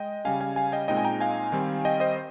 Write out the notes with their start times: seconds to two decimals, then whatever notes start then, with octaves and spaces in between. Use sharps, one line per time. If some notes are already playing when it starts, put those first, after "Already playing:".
Already playing: G#3 D#5 G5
0.25 C#3 G3 C#4 F5 G#5
0.40 F5 G#5
0.56 F5 G#5
0.72 D#5 G5
0.88 A#2 G#3 C4 D#4 D#5 G5
0.97 G#5
1.05 G5 A#5
1.20 F5 G#5
1.52 D#3 G3 C4
1.85 D#5 G5
2.00 C5 D#5